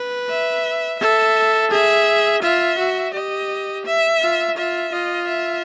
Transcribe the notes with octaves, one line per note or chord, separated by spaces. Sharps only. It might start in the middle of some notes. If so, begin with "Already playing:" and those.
Already playing: B4
E5
A4 E5
G#4 E5
F4 E5
F#4
G4 D#5
E5
F4
F4 E5
F4 D#5
E5